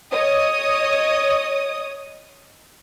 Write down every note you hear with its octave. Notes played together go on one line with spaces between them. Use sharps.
C#5 D#5 D#6